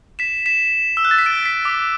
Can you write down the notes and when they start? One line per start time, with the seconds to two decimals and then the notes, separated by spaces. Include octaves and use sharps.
0.19 B6 E7
0.46 B6 E7
0.97 E6
1.05 F#6
1.11 A6
1.19 B6
1.26 A6 D7
1.45 B6
1.65 D6